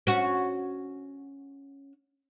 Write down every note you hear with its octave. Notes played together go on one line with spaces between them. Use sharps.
C#4 F#4